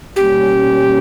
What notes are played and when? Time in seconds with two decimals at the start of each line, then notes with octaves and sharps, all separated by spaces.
0.16 B2 G3 A#3 C#4 G4